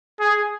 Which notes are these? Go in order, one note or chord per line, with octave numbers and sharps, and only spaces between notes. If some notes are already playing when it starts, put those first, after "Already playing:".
G#4